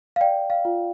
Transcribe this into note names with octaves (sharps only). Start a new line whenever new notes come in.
F5
D5 G5
F5
F4